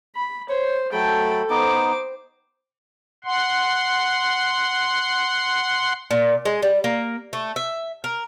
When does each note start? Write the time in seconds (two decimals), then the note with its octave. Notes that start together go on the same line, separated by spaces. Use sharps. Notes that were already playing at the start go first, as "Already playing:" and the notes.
0.16 B5
0.49 C5 C#5
0.93 F#3 A3 A4 G5 A5 B5
1.50 B3 D#4 C5 D6
3.25 F#5 C6
6.11 A#2
6.45 G#3
6.63 G3
6.84 A#3
7.33 A3
7.56 E5
8.04 A#4